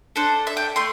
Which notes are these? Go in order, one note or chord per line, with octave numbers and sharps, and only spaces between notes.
D4 A4 C5
E5
G5
A3 C6